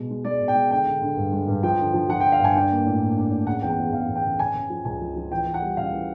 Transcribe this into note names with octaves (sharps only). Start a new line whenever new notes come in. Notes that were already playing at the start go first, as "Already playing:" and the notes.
Already playing: B2 G#3
G#3
G#3 D5
B2
G5
G#3
D3 G5
D3
D3
G2
G#3
G2
F3 G5
D3
F3
F3 F#5
G5
D3
F5
G2 G#5
D4 G5
A#3
A2
A#3
D4
A2
C#3 F#5
E2 G5
F#5
E2
E2 F5
E2
G5
C#3
C#3 G#5
C#3
F3
C#2 G#5
F3
F3
E3 G5
E3
F#5
G3
C#3 F5
E3